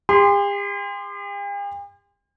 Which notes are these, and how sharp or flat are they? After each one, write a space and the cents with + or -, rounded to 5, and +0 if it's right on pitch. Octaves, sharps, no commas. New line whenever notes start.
G4 +45 C6 -15